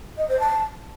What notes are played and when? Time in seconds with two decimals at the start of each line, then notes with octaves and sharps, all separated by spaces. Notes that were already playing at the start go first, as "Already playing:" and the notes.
0.17 D#5
0.29 C5
0.40 A5